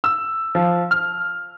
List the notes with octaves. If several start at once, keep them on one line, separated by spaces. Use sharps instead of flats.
E6
F3
F6